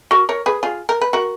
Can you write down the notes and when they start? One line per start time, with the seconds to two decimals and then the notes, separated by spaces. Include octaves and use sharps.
0.11 F#4 A#4
0.29 A#4 C#5
0.46 G#4 B4
0.63 F4 G#4
0.89 A#4
1.01 B4
1.13 F#4 A#4